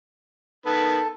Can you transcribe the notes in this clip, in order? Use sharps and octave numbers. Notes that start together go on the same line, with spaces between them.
D#3 B3 A4 B4